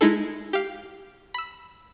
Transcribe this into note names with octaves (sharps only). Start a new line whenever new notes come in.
G#3 D#4 E4 G#4 A4
G4 F5
B5 E6